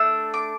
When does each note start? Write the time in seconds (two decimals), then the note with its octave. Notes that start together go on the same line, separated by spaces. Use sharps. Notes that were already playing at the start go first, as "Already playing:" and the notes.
Already playing: A3 D4 E6
0.34 D6